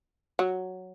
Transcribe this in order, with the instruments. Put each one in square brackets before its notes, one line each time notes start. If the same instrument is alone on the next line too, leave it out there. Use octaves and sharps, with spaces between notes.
[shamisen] F#3